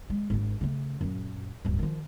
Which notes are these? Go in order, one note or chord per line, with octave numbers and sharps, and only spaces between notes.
G#3
G#1 D4
C#3 A3
F#2 A#2
D1 G1
D#3 F3